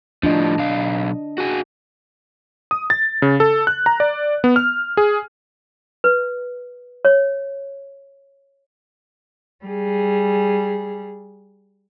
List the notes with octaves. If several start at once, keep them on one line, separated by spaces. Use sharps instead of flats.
A2 F3 D4 D#5
B1 F5
F#4 G#4
D#6
A6
C#3
A4
F#6
A#5
D5
B3
F6
G#4
B4
C#5
G3 G#4